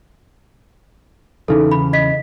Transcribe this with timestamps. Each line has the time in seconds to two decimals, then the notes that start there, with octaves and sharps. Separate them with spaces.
1.48 E2 C#3 E3 D#4 A4
1.72 B5
1.93 D#5 B6